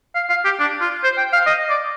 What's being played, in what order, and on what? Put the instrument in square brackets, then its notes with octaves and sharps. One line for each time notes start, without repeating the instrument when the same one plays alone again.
[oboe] F5
F5
G4
D4
F4
C5
G5
F5
D#5
D5